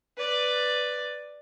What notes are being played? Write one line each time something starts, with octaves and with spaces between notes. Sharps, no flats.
B4 D5